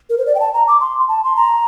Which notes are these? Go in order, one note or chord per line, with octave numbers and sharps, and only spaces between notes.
A#4
C5
D5
G5
A5
A#5
D6
C6
A5
C6
A#5